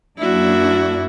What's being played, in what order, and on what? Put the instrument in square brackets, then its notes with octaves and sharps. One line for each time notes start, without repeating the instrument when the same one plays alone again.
[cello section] F#2 A#3 D4 [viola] E4 F#4